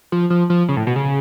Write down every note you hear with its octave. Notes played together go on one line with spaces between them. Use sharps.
F3
F3
F3
C#3
A2
B2
C#3